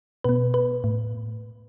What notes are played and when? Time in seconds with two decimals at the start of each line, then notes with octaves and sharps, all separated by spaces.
0.24 B2 B3 B4
0.54 B4
0.84 A2